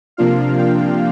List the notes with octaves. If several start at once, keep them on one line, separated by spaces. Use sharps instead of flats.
C3 F3 A#3 D4 F4 F5
G5